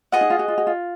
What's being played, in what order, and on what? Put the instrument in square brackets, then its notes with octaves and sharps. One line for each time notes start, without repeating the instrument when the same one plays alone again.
[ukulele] F4 [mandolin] G#4 D#5 F#5
[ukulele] D#4
F4
F#4
F4
F#4
F4